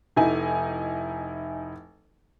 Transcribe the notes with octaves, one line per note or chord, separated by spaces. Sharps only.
F1 D#4 E4 G#5